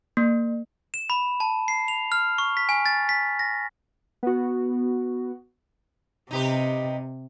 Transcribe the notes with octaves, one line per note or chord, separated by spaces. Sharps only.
A#3
E7
B5
A5
C7
F7
F6
C#6
B6
G#5
A6
B6
A#6
B3 F#4
C3 D#4 G4 B4